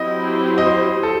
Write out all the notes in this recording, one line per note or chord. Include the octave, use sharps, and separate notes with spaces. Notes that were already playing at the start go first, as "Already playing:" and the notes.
Already playing: F#3 C4 E4 G4 D#5
D#5
C5
A4